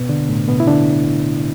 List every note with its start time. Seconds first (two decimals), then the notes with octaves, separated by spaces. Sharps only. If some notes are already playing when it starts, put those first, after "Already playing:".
Already playing: B2 B3
0.09 D3 D4
0.29 A2 A3
0.48 B2 B3
0.60 E4
0.67 D3 D4